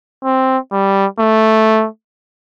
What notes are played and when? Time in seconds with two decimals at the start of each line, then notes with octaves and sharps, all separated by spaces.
0.24 C4
0.72 G3
1.19 A3